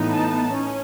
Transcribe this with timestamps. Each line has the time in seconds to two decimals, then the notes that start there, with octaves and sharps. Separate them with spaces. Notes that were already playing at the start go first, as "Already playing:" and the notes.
Already playing: A2 E3 B3 D#4
0.12 A5
0.53 C#4